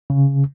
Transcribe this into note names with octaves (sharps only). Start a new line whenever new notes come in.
C#3